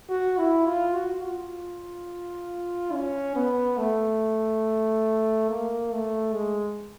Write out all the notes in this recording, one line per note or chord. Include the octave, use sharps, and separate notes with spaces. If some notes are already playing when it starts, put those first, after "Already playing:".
F#4
E4
F4
F#4
F4
C#4
B3
A3
A#3
A3
G#3